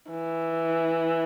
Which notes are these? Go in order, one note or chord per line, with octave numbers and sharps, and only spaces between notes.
E3